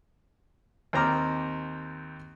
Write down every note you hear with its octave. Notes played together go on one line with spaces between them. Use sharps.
D#2 C4 A#5 D6 F6